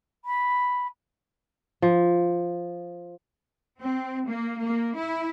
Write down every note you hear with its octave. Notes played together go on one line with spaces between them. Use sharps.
B5
F3
C4
A#3
A#3
E4